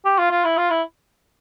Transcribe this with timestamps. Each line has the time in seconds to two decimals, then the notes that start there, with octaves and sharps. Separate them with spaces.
0.05 G4
0.18 F4
0.31 F4
0.44 E4
0.57 F4
0.70 E4